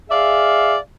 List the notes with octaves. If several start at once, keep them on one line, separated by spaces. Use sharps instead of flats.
G#4 D5 E5 F5